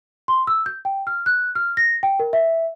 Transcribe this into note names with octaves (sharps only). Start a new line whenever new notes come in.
C6
E6
G6
G5
F6
F#6
F6
A#6
G5
A#4
E5